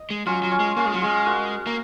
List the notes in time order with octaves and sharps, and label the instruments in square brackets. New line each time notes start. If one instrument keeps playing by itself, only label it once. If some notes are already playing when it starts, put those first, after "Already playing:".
Already playing: [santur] D#5
[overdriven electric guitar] G#3
[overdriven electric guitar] F#3 [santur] C#4 F4
[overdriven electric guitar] F#3
[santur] C#4 F4
[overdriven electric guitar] G#3
[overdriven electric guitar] A#3 [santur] C#4 F4
[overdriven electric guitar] G#3
F#3
[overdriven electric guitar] G#3 [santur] F4 G#4
[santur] F#4 A#4
[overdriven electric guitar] A#3